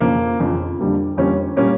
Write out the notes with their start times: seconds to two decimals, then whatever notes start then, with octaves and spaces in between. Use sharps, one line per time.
0.01 F2 C#3 F3 A#3
0.40 F2 C#3 F3
0.79 F2 D3 G3 A#3
1.17 F2 D3 G3 A#3 C#4
1.57 A#2 G3 A#3 C#4